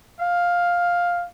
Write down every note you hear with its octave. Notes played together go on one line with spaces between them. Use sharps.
F5